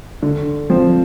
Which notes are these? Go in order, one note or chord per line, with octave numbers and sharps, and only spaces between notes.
D3
F3 C4